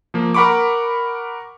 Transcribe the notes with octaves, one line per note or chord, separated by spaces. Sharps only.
F3 A#3
A#4 F#5 B5 C#6 D6